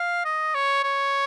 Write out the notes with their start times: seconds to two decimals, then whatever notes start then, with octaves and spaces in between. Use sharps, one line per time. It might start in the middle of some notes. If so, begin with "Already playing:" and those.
Already playing: F5
0.25 D#5
0.54 C#5
0.83 C#5